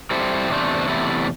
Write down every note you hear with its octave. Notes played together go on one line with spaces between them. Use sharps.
G3 C4 E4 A4 C5
E2 C3 A3 D4 C5
E2 C3 A3 E4